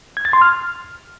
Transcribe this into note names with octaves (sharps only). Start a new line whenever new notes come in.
G#6
A6
C6
F6